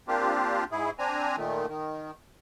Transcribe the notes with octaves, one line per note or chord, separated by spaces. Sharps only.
A#3 C4 D4 F4 G4
G#2 E4 G#4
C4 D4 G#5 A#5
A#2 D#3 A3
D#3